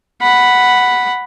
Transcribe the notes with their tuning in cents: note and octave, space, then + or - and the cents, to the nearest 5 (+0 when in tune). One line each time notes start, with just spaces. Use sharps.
F#5 +0 B5 +0